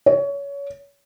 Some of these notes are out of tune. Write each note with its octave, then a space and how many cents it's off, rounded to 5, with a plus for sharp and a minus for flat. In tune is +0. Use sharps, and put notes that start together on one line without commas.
C#5 +25